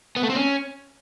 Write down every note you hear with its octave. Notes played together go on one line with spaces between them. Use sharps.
B3
A3
C4
C#4